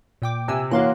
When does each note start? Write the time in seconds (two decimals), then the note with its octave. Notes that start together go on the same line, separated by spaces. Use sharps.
0.22 A#2 G5 D6
0.48 C3 G#5 E6
0.71 E3 A#3 F#4 C#5 F5 C6 F#6